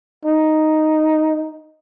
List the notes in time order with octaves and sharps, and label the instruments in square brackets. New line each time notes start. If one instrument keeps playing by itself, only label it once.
[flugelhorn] D#4